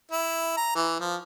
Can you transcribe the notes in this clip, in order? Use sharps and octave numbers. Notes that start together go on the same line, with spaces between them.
E4
A#5
E3
F3